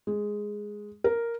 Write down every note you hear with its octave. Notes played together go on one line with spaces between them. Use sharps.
G#3
A#4